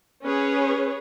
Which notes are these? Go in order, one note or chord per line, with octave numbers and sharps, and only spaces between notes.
C#4 G#4 B4 C#5